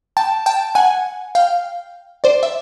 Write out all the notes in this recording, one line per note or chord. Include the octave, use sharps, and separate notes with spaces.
G5 A5
G5 A5
F#5 G#5
F5 G5
C5 D5
E5